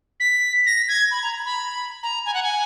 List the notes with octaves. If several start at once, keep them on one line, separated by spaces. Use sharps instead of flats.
B6
A#6
G#6
B5
A#5
B5
A#5
G#5
F#5
G#5